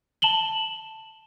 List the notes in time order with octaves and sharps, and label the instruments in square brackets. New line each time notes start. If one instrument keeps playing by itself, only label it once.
[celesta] A5 E7 F#7 G7